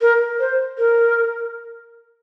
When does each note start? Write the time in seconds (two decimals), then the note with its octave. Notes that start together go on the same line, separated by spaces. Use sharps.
0.01 A#4
0.40 C5
0.78 A#4